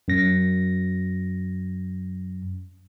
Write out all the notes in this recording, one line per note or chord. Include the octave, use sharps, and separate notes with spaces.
F#2 A#6